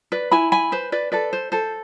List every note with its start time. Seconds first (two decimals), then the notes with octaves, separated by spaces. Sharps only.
0.12 B4 D5
0.31 E4 G#5 B5
0.52 G#5 B5
0.72 B4 C5
0.92 B4 D5
1.12 A4 B4 D5
1.33 C5
1.52 A4 C5